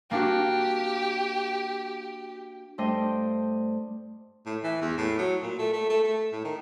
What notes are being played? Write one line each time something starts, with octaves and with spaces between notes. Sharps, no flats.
A#3 D4 F#4 G4
G2 A3 D4 C5 D#5 G5
A2
E3
E2
A2
F#3
A#2
A3
A3
A3
A3
A2
D#3